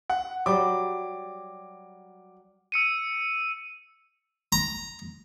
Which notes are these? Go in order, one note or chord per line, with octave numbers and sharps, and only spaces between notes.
F#5
F#3 G3 D6
E6 C#7 D#7
A#5